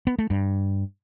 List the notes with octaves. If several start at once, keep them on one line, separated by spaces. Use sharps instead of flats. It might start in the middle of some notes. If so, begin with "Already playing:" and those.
B3
A3
G2